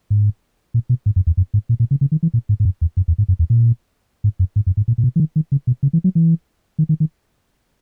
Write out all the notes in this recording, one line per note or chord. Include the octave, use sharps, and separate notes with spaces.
G#2
A#2
B2
G#2
F#2
E2
F#2
G#2
A#2
A#2
C#3
C#3
D#3
E3
A#2
G#2
G#2
F#2
E2
F#2
E2
G#2
F#2
E2
A#2
G#2
F#2
G#2
F#2
G#2
A#2
A#2
B2
E3
D#3
D#3
C#3
B2
C#3
E3
F#3
E3
D#3
D#3
D#3